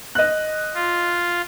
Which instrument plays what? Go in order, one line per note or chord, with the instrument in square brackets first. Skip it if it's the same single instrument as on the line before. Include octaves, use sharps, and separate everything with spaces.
[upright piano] D#5 F#6
[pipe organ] F4